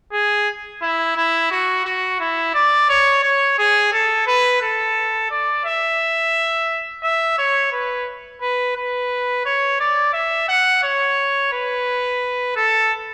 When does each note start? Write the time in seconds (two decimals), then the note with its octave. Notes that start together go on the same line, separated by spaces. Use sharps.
0.13 G#4
0.82 E4
1.17 E4
1.51 F#4
1.85 F#4
2.21 E4
2.54 D5
2.89 C#5
3.23 C#5
3.59 G#4
3.93 A4
4.27 B4
4.62 A4
5.31 D5
5.65 E5
7.03 E5
7.38 C#5
7.72 B4
8.42 B4
8.76 B4
9.46 C#5
9.80 D5
10.13 E5
10.49 F#5
10.83 C#5
11.53 B4
12.56 A4